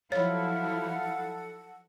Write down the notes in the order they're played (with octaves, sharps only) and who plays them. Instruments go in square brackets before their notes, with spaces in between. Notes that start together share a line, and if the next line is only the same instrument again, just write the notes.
[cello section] F3 F#3 E4 [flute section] A4 F#5 [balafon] C#5 [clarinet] F5